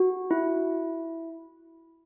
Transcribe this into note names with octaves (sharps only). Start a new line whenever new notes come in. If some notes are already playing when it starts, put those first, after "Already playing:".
Already playing: F#4
E4